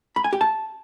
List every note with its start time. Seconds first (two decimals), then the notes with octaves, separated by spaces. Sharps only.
0.16 B5
0.24 G#5
0.33 G4
0.41 A5